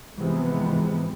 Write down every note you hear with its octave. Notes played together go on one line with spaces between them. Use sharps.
G#2 C3 E3 F3 G#3 B3